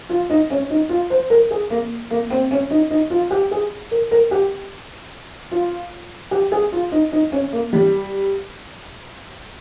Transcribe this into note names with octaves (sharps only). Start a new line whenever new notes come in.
F4
D#4
C#4
D#4
F4
C5
A#4
G#4
A#3
A#3
C4
C#4
D#4
D#4
F4
G4
G#4
A#4
A#4
G4
F4
G4
G#4
F4
D#4
D#4
C#4
A#3
G3